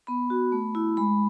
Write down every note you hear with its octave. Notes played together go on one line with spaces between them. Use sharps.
B3 B5
F#4
A3
E4
G#3 B5